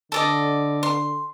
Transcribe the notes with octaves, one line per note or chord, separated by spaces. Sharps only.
D3 A4 D5 D#5
C6